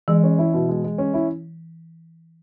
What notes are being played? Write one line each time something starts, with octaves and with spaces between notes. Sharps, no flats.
E3 G#3
C#4
E4
B2
G#3
G#3
C#4
E4